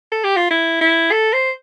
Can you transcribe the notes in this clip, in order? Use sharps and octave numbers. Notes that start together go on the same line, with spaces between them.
A4
G4
F4
E4
E4
A4
C5